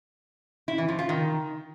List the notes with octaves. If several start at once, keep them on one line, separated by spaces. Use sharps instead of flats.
E4
E3
F3
F4
D#3